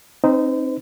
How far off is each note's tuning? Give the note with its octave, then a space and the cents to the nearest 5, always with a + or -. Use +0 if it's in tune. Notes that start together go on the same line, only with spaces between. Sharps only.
C4 +25 D#4 +0 C5 -40